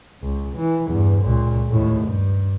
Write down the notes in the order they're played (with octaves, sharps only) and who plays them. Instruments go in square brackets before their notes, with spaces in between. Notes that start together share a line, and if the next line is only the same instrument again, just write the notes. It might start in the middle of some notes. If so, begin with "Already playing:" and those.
[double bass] C#2
E3
E2 G2
C#2 A#2
D#2 A2
G2